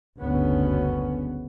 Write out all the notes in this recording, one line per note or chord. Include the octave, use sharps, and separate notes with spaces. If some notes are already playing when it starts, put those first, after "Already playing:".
F#1 D2 G2 C#3 B3 C#4